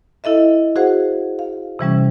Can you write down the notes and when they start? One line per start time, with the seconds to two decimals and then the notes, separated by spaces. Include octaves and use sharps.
0.24 E4 A4 D#5 E5
0.76 F#4 G#4 C5 F5 F#5
1.39 F5
1.79 C3 E3 G3 C#4